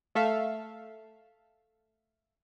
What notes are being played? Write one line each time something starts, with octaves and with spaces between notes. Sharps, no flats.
A3 A4 E5 F5